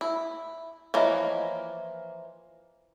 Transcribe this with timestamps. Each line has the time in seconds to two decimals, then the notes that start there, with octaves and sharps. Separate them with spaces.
0.01 E4
0.94 E3 F3 A#3 C#5 D#5